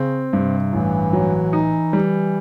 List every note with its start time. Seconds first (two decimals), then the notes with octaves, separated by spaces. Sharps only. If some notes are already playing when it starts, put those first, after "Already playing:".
Already playing: C#3 C4
0.33 G2 C3
0.72 A1 E3
1.13 F#3
1.53 D#4
1.93 G3